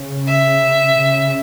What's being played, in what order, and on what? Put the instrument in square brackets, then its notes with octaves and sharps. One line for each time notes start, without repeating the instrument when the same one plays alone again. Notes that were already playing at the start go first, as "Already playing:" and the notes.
Already playing: [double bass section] C#3
[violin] E5
[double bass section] C#3